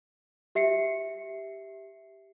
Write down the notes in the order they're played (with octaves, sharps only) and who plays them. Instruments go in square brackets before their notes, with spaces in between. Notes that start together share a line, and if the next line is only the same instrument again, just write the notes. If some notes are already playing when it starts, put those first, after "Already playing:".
[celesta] G4 E5 C7 C#7